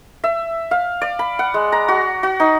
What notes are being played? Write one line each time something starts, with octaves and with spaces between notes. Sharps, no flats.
E5
F5
D5
B5
F#5
G#3
A#5
F#4
F#4
D#4